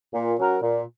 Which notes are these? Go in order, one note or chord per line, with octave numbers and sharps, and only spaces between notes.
A#2
F#3 C#4 F#4 A#4
A#2